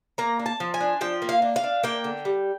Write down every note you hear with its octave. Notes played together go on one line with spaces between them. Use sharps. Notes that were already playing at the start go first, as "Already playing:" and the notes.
A#3 A#5
D4
A5
F3
G#5
D4
F3 G5
A#3
F5
D4
F5
D4
A#3 G5
D3
G3